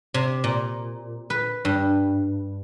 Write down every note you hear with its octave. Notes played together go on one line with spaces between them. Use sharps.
C3
A#2
B4
G2